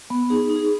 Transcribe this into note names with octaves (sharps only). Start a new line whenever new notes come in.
B3
D#4 G#4
D#4
G#4